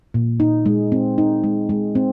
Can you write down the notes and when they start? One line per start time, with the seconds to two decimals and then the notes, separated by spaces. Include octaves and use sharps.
0.14 A#2
0.40 D#4
0.66 G#3
0.92 C4
1.18 D#4
1.44 G#3
1.69 G#3
1.95 C4